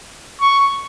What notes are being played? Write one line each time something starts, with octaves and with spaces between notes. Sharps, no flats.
C#6